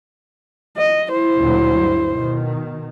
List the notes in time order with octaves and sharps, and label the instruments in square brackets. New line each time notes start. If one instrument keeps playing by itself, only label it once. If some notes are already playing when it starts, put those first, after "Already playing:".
[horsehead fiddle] D#5
E4 C5
[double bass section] D2 A#2 F#3
G2
B2 D#3